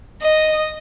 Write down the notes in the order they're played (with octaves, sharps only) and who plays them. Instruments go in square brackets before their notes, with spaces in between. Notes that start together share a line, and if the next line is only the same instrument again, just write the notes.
[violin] D#5